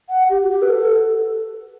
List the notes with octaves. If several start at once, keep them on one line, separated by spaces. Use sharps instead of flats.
F#5
G4
F#4
G4
B4
A4